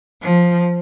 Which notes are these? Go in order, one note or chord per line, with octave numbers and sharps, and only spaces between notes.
F3